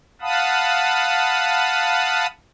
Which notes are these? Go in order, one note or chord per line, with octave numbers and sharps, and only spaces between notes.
F5 F#5 A5 B5 D#6